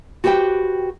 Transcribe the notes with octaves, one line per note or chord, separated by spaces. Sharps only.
F#4 G4 B4 C5 G5